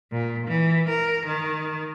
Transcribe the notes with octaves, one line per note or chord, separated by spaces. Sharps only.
A#2
E3
A#4
D#3